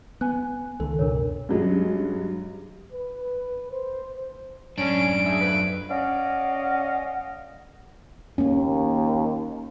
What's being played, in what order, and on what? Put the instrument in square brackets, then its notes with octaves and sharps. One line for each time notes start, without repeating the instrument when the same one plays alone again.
[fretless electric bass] B3 [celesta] G#5 F#6
[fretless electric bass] C#2 [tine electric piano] D#3 A4
[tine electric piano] F#2 B2 [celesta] D4 A#4 C#5
[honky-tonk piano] G2 F#3 G#3 C#4
[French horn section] B4
C5
[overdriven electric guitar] F#2 D4 [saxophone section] C#4 [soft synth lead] D7
[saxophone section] D#4 G#4 E5
F2 B4
[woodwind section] C#4 D5 D#5 F5 F#5
[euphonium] D#2 [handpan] A#3 C#4